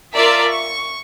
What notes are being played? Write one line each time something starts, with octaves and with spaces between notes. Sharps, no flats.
F4 A#4 D5 E5 A5
C#6